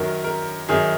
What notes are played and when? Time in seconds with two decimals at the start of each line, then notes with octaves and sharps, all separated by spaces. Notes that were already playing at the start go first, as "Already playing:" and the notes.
Already playing: F#2 D#3 F#3 A#4
0.24 A#4
0.69 F#2 D#3 F#3 G#4